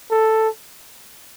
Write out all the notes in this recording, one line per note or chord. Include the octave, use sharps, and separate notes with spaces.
A4